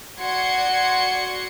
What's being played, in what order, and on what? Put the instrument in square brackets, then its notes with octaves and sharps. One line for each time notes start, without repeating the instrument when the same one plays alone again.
[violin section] F#4 D5 C6 G#6 C#7